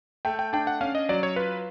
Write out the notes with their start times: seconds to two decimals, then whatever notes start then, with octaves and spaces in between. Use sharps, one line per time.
0.25 A3 G5
0.39 G5
0.53 D4 G5
0.67 F#5
0.81 C#4 F5
0.95 D#5
1.09 F#3 D5
1.23 C#5
1.36 F4 B4